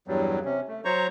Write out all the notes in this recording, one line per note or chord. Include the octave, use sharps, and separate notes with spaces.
E2 G2 F#3 G3
C3 C#4
A3
F#3 C5 C#5 A#5 C#6